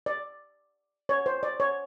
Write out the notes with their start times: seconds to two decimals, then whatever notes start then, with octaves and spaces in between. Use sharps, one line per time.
0.06 D5
1.09 C#5
1.26 C5
1.43 D5
1.60 C#5